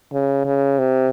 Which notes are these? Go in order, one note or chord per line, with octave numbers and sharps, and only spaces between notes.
C#3
C#3
C3